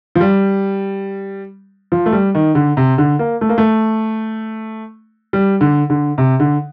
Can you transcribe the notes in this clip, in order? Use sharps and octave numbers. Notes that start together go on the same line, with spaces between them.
F3
G3
F3
A3
G3
D#3
D3
C3
D3
A#3
A3
A#3
A3
G3
D3
D3
C3
D3